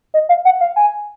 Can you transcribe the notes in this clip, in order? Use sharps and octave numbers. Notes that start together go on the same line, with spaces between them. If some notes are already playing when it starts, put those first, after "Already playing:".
D#5
F5
F#5
F5
G#5